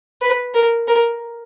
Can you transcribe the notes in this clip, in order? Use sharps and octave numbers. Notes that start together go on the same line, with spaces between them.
B4
A#4
A#4